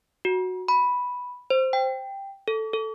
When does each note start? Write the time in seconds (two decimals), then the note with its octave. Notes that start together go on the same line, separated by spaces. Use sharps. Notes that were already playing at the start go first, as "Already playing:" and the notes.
0.25 F#4
0.68 B5
1.50 C5
1.73 G5
2.48 A4
2.73 A4